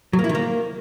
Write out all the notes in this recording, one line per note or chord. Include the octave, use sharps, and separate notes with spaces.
F#3
A#3
E4
D#3
A#3